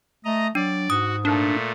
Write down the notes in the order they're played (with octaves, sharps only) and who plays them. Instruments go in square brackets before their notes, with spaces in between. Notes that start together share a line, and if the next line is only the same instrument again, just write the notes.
[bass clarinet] A3 [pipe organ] D#5 A#5
[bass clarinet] F#3 [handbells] D4 [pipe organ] D5
[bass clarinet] G#2 [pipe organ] F#4 [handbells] D#6
[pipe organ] A#2 A3 [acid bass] D4